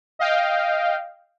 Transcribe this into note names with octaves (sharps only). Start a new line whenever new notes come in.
D#5 F5 G5